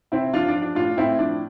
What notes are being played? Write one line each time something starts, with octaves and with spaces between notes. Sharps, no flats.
C3 C4 E4
F3 D4 F4
D4
F3
D4
A2 D4 F4
A2 C4 E4
F3 D4